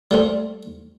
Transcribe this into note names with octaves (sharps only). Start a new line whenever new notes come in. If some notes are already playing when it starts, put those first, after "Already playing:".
G3 A3 C4